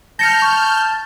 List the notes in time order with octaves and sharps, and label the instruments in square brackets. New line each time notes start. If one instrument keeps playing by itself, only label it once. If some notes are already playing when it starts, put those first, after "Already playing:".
[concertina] A5 [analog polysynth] F6 G6 [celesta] A#6 C#7
[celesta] C#6